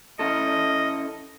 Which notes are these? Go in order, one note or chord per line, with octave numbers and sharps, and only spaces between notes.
C#4 E4 A4 D#5